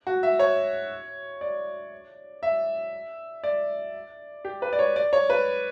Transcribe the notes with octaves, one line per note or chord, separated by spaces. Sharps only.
F#4
E5
C#5
D5
E5
D5
G4
B4
D5
C#5
D5
C#5
B4